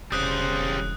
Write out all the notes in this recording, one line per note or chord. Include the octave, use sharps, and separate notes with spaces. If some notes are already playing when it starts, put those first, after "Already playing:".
E1 C#3 G3 C5 D#6 F#6